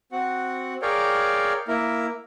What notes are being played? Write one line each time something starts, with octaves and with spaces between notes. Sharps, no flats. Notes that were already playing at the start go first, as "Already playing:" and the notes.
C4 F#4 F#5
G#4 A#4 C#5 D5 F5 G5
A#3 E4 A#4